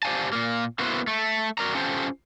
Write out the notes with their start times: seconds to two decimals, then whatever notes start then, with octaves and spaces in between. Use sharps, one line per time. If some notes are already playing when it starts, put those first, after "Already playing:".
0.03 G4 C5 D5 F5 G#5 A5
0.33 A#2 A#3
0.79 A#3 B3 E4 F#4 B4 C5
1.07 A3
1.58 F#4 A#4 D5 A#5
1.75 C#4 F4 G4 A4 C5